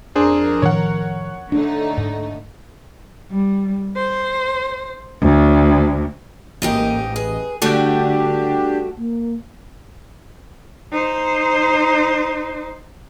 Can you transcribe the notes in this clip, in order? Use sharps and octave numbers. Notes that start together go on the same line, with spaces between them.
F2 D4 G#4 A#4 C5
A2 D#3 F3 C#5 F#5
D3 A3 D4 D#4
G#2
G3
C5
D2
A1 G#2 A#3 D#4 G4 D#5
G#4 B4
D3 G3 A3 D4 F#4 G4
A#3
D#4 C5